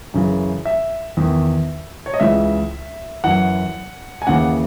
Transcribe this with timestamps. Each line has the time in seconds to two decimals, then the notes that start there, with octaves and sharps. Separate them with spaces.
0.14 F#2 C#3 E3
0.65 E5
1.17 E2 D#3
2.06 C#5
2.14 D#5
2.20 C#2 C#3 E3 E5
3.24 F#2 E3 F#5
4.22 G#5
4.27 D#2 C#3 E3 F#5